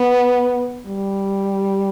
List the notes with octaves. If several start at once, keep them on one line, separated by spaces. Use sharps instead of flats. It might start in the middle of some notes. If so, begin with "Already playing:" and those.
Already playing: B3
G3